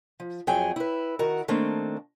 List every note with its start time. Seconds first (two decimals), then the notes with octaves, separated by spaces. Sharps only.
0.20 F3
0.47 F2 F#3 G#4 G5 G#5
0.76 E4 B4
1.19 D#3 F#4 A#4
1.48 D#3 A3 A#3 C4 D4